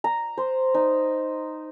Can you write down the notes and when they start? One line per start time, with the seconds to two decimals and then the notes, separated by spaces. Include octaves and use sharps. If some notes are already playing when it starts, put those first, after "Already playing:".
0.04 A#5
0.38 C5
0.74 D#4